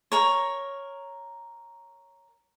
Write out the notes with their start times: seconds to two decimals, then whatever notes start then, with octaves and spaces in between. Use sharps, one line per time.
0.12 A#4 C#5